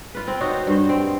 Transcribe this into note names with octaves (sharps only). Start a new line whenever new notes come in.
F4 B4
C4
D#4 F#4 C5 C#5
G2 C5
C4